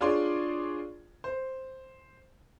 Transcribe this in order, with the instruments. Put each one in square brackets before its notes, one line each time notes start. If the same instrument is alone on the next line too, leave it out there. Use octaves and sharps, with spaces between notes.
[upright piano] D4 F4 G#4 C#5 D5 C6
C5